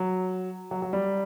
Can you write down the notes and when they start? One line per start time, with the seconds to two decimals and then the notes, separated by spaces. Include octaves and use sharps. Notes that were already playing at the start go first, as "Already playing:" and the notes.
Already playing: F#3
0.71 F#3
0.82 F#3
0.93 G3